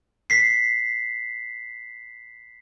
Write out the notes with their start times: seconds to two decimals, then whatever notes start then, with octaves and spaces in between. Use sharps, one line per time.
0.30 B6 C7